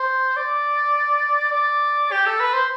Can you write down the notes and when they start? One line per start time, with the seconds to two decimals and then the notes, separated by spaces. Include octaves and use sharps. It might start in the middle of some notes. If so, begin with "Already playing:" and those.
Already playing: C5
0.37 D5
1.52 D5
2.12 G4
2.26 A4
2.40 B4
2.53 C5